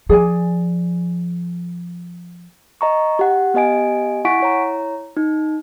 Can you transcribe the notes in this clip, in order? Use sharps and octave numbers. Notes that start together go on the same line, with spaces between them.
F3 G#4 D5 G#5
D#5 A#5 C#6
G4 F#5
B3 G4 D#5 G#5 D7
E4 F#5 G#5 C#6 B6 D7
E4 C#5 A#5
D#4